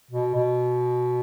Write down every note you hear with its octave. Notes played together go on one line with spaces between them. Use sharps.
B2
B2